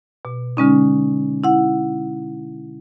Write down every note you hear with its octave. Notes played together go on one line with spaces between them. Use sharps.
B2
D3 G#3 C#4 D#4
E4 F#5